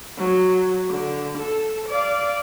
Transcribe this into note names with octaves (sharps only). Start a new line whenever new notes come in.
F#3
D3
A4
D5 F5